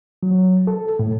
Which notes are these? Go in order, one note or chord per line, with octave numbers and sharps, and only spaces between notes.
F#3
A4
A2